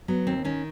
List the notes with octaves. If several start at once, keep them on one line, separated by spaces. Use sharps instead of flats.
F#3 B3
D#2 C4
D#3 C#4